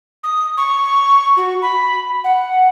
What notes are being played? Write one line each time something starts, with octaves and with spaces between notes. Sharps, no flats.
D#6
C#6
F#4
B5
F#5